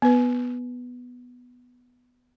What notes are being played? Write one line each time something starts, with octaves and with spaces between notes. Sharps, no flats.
B3 B4